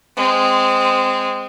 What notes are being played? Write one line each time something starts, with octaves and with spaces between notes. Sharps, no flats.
G#3 C4